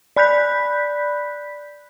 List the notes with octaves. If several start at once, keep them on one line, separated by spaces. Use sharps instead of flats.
D5 B5 F#6 G6 B6